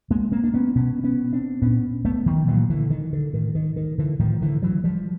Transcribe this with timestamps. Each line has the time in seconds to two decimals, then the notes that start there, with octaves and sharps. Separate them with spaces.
0.10 G#3 A#3
0.32 A#3 C4
0.44 D4
0.54 B3 C#4
0.75 B2 B3 C#4
1.04 B3 C#4
1.33 C4 D4
1.62 A#2 B3 C#4
2.05 A3 B3
2.26 D#3 F3
2.47 A#2 E3 F#3
2.70 D3 E3
2.90 D#3
3.13 D3
3.33 A2 D#3
3.55 D#3
3.76 D#3
3.98 D3 E3
4.19 A2 D#3 F3
4.42 D3 E3
4.62 E3 F#3
4.84 F3 G3